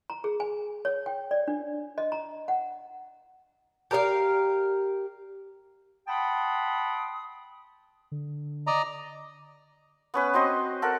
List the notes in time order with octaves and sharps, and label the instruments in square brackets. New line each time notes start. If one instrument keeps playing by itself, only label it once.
[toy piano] A#5
G#4
G#5
C#5
G5
D5
D4
D#5
A#5
F#5
[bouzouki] G4 A#4 D5 F5
[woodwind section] F#5 G5 A5 B5 C6 D#6
[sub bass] D3
[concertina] D5 D#5 A#5
[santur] B3 C#4 B4
C4 F#4 C5 D#5
A4 A#4 F#5